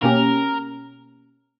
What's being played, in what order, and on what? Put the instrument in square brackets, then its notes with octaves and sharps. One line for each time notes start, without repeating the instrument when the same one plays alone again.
[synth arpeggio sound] B2 A#3 C#4 G4 [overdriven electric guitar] A#4